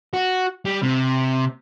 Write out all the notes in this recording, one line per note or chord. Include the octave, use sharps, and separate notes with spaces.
F#4
G3
C3